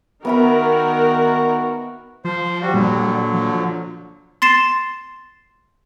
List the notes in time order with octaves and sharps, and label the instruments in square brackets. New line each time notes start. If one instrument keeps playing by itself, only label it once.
[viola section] D#3 A#4 [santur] B3 E5 B5 [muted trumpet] F#4
[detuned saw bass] F3 [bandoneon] C5
[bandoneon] G3 F#4
[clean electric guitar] A#2 [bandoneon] D3 F#3 [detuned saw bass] G3
[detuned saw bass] F3
[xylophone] C6 A6 C7 E7